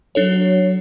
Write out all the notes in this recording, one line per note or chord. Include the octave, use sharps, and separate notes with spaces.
F#3 D4 A4 C#5